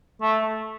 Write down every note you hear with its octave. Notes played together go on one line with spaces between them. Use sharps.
A3